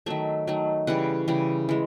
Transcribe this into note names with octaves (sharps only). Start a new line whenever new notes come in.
D#3 F#3 A3 E5
D#3 F#3 A3
C#3 E3 G3 F#5
C#3 E3 G3
E3 G#3